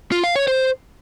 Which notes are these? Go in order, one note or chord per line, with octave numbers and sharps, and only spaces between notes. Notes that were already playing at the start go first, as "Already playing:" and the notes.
F4
F5
C#5
C5